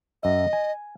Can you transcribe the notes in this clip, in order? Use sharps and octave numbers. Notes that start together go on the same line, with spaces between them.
F#2 D#5 E5
G#5